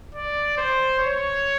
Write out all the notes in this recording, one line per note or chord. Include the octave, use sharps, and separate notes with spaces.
D5
C5
C#5